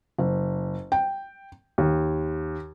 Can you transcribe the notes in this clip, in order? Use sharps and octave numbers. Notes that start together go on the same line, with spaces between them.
F#1
G5
D#2